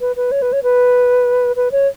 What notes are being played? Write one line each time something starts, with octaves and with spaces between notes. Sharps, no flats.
B4
B4
C#5
B4
C#5
B4
B4
C#5